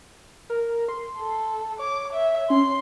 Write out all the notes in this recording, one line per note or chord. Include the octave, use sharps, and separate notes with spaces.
A#4
C6
A4
C#5 D6
E5
C#4 C6